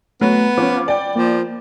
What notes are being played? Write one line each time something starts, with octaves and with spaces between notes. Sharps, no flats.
F#3 A3 B3
F3 C#4 D6
D5 G5
F3 A#3